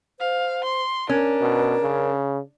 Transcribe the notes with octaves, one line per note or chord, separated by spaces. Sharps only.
C5 F5
C6
C#4 D4 A#4
B2
C#3